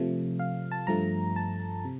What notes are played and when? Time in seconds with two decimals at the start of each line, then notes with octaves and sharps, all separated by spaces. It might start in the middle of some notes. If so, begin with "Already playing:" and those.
Already playing: C3 F3 A3
0.39 F5
0.72 A5
0.87 G2 F3 A3 A#5
1.36 A5
1.85 C3